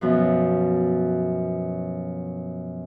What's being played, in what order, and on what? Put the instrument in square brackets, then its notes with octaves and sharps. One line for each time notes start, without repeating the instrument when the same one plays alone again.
[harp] F#2 B2 F3